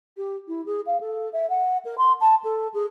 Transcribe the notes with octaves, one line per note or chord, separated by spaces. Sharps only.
G4
E4
G#4
F5
A4
E5
F#5
A#4
C6
A5
A4
G#4